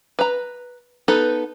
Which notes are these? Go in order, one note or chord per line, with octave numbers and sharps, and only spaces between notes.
B4 A#5
B3 D#4 A4 B4 F#5